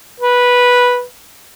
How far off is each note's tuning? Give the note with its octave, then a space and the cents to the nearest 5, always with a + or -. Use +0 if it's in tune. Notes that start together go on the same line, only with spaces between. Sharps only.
B4 -10